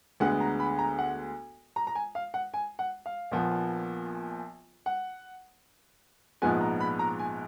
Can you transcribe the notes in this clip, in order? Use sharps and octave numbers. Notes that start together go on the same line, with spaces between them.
D2 D3 G#3 B3 F#5
A#5
B5
A#5
F#5
A#5
A#5
G#5
F5
F#5
G#5
F#5
F5
A#1 A#2 F3 B3
F#5
A#1 G#2 F3 G#3 B3 G#5
A#5
B5
A#5
G#5